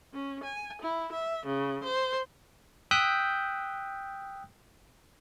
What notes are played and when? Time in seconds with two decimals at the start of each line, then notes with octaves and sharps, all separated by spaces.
0.13 C#4
0.43 G#5
0.81 E4
1.11 E5
1.45 C#3
1.83 C5
2.91 G5 D#6 E6 F#6 G6 B6